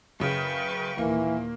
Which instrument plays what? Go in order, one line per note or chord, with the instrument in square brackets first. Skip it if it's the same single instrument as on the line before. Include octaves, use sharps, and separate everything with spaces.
[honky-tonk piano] F#2 C#3 [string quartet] B4 G5 C#6
[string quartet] D#2 A#2 [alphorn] E3 [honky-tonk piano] A#3